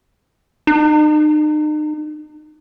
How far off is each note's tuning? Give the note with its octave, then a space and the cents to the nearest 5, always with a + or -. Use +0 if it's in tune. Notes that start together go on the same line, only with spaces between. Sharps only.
D#4 -40